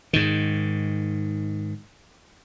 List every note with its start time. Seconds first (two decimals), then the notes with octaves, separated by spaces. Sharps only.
0.13 G#2 D#3